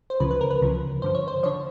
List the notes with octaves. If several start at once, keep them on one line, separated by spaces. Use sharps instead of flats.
C5
C#2 C#3 F3 B4
B4
A#4
B4
C#2 C#3 F3
G2 D3 F3 C5
C#5
C5
D3 F3 C#5